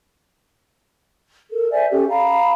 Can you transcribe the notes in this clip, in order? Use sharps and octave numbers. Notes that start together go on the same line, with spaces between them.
A4 A#4
C5 D5 E5 G#5
C#4 G4 A4
F5 A#5 B5